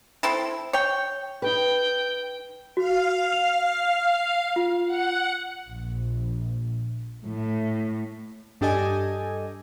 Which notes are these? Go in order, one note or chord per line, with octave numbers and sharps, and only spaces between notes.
C4 E4 A4
C#5 G5
D#4 B4 G5
F#4 F5
F7
F4
F#5
A#1
A2
G2 D4 G4 A4 D#5 G#5